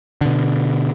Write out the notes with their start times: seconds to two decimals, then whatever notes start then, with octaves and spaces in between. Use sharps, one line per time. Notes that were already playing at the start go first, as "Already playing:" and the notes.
0.21 B2 D3